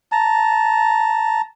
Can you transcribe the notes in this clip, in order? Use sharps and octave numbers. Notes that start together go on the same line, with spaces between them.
A5 A#5